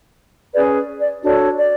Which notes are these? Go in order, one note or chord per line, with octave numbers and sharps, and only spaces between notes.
C#4 G#4 B4 D5
D5
D4 F#4 A4 C#5 D5
D5